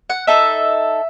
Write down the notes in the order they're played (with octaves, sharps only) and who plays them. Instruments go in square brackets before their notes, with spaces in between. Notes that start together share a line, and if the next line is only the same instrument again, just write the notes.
[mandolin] F#5
D#4 A4 E5